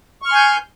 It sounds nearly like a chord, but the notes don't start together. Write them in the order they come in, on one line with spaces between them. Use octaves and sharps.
C#6 F6 C6 G#5 G6